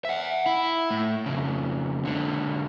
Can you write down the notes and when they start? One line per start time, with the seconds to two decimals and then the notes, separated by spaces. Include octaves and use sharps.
0.05 E5 F#5
0.46 E4
0.91 A2
1.26 F2 C#3
2.05 B1 D3